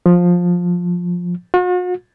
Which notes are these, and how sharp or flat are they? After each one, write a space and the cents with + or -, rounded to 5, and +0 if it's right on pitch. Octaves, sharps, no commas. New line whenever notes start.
F3 +15
F#4 -45